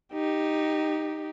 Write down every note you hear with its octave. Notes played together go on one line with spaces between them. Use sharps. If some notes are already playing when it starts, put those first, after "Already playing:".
D#4 G4